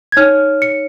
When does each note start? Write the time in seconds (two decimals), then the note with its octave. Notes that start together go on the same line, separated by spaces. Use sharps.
0.12 G#6
0.17 D#4 C#5 F6
0.62 C#7